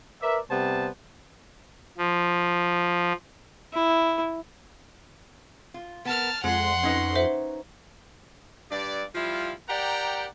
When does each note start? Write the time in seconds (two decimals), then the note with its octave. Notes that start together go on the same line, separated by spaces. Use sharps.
0.22 A#4 B4 D5 E5
0.51 C3 G3 B3 C5 A5
1.98 F3
3.73 E4
5.74 F4
6.05 B3 A#4 A5 F6
6.44 F2 G#3 F#5 C6
6.83 C#4 D#4 B4
7.15 C5 E5
8.71 G2 D5
9.15 F3 G3 E4 F4
9.69 G4 A#4 D5 F#5 G5 A#5